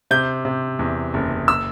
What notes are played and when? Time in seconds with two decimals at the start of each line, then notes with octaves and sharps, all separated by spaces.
0.11 C3 G6
0.45 C3
0.79 E2
1.14 F#1
1.48 E6